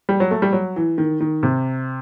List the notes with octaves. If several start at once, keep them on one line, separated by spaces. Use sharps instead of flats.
G3
F#3
A3
G3
F#3
E3
D#3
D#3
C3